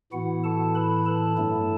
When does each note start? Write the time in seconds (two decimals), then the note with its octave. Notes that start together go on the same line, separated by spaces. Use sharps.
0.12 A2 E3 B3 E4 F#4 F#5
0.44 A4 A5
0.75 B4 B5
1.06 A4 A5
1.37 G2 F#3 A3 E4